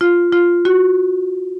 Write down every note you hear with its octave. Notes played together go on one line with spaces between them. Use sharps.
F4
F4
F#4